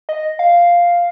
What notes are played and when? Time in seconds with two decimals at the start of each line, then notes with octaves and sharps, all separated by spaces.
0.09 D#5
0.39 F5